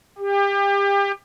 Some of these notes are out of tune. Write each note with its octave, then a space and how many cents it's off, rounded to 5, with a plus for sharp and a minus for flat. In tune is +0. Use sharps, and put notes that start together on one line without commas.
G4 +30